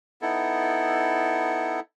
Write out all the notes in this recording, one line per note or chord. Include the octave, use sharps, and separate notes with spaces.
B3 D#4 E4 A4